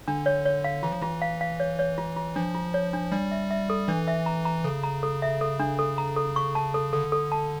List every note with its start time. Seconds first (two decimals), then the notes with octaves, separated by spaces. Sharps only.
0.08 D3 D4
0.26 C#5
0.45 C#5
0.64 F5
0.83 E3 F4
0.92 F3
1.02 E3 F4
1.22 F5
1.41 F5
1.60 C#5
1.79 C#5
1.98 F4
2.17 F4
2.36 F3 D4
2.55 F4
2.74 C#5
2.93 D4
3.12 G3 D4
3.31 E5
3.51 E5
3.70 A4
3.88 E3 D4
4.08 E5
4.26 A#5
4.45 A#5
4.64 C#3 A4
4.83 A#5
5.03 A4
5.22 E5
5.41 A4
5.60 D4
5.79 A4
5.98 A#5
6.17 A4
6.36 C#6
6.55 A5
6.74 A4
6.93 D3 A4
7.12 A4
7.32 A5